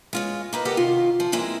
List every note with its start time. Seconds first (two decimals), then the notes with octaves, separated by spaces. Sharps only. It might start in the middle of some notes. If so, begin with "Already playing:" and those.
0.13 G#3 F4 C#5
0.53 A#3 D#4 B4
0.65 G4 A4 A#4 D#5 F#5 G5
0.77 C3 D#3 F4
1.20 F3
1.32 G#3 A#3 C4 E4 G#4